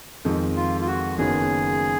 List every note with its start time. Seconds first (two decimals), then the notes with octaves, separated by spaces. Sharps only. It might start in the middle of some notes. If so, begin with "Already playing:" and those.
0.25 F2 D#3 G#3 D#4
0.56 F4
0.81 F4
0.87 F#4
1.18 F#1 F#2 D#3 F#3 B3 G#4